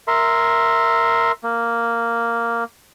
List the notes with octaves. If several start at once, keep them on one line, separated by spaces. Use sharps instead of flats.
A#4 E5 C6
A#3